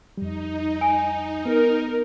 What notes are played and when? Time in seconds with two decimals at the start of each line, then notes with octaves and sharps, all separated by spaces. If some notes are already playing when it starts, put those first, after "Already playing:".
0.18 F2 G3 D#4
0.81 G#5
1.46 B3 A#4